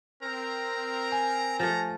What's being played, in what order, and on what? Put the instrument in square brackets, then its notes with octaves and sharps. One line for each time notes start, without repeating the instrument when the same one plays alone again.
[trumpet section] C4 A#4 [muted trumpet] A#5
[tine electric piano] G#5
[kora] F3 A3 [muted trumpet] A#5